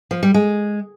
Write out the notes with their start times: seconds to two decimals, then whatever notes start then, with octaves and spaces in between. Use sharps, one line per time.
0.11 F3
0.23 G3
0.34 G#3